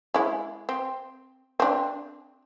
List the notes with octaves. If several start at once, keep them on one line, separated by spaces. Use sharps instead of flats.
G#3 E4
C4
C4 D4